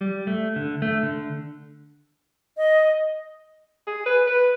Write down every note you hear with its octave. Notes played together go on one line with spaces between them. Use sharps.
G3
A3
D3
A3
D3
D#5
G#4
B4
B4